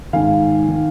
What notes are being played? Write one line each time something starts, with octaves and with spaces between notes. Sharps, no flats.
G#2 D#3 F5 G#5
D#3